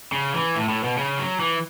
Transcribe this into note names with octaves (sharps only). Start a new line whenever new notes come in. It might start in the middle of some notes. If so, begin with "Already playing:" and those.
C#3
E3
A2
A2
B2
C#3
F#3
E3